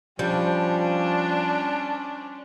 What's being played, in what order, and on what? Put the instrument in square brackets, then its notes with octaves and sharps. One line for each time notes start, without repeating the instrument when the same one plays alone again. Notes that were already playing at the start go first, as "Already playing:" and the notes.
[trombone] F3 [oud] G3 [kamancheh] C#4 C5 [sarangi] D4